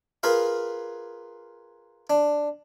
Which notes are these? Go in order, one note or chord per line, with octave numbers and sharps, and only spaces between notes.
F4 G#4 A#4 B4 F5
D4